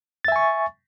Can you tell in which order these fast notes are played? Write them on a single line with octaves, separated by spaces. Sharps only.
A6 E5 G#5 C#6